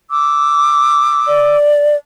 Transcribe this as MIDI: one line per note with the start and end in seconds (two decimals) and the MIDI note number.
0.10 1.56 86
0.10 1.56 88
1.27 1.96 74